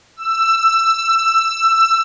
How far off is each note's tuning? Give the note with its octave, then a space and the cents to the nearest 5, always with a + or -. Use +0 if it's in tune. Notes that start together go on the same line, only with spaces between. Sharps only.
E6 +15